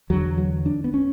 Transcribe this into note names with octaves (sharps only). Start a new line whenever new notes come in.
E2 D3 F#3
F#3
D4
B3
C#4